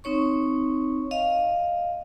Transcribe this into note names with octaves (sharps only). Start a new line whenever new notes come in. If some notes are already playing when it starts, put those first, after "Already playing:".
C4 D#4 C#5 C#6
D#5 F5